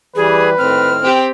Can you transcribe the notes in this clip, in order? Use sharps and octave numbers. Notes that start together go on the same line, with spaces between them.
E3 G3 G#4 B4
A2 D#3 C4 F6
C4 G4